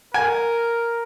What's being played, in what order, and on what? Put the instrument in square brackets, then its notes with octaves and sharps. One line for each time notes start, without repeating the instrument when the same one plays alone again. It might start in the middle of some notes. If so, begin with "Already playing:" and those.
[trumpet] A#4 [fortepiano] G#5